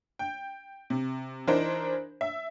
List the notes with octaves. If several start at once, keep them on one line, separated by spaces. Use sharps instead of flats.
G5
C3
E3 D4 D#4 A#4 C5
E5